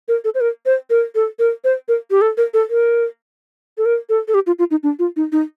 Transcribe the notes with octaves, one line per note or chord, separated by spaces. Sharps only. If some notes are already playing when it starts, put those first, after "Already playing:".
A#4
A4
C5
A#4
C5
A#4
A4
A#4
C5
A#4
G4
A4
A#4
A4
A#4
A4
A#4
A4
A4
G4
F4
F4
D#4
D4
F4
D#4
D#4